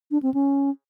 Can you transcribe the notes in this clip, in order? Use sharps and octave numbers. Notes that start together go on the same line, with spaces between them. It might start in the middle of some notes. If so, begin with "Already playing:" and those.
D4
C4
C#4